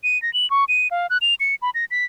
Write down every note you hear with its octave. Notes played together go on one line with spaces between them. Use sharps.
D#7
A#6
F#7
C#6
D#7
F5
F#6
F7
C#7
B5
A#6
B6